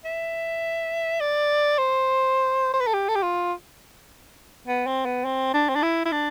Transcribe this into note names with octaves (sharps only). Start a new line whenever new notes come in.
E5
D5
C5
C5
B4
A4
G4
A4
G4
F4
B3
C4
B3
C4
D4
C4
D4
E4
E4
D4